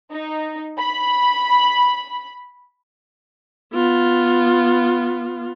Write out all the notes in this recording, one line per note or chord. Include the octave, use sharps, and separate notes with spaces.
D#4
B5
B3 F4